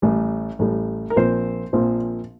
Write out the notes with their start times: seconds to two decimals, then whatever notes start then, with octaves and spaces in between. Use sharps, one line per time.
0.02 A1 A2 G3
0.59 A1 A2 G3
1.10 A#4
1.16 A#1 A#2 F3 C4 C5
1.73 A#1 A#2 F3 C4